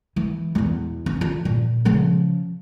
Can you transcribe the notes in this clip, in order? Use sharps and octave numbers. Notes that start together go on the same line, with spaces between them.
E3
E2 B2
C#4
F4
A#2
C#3 F3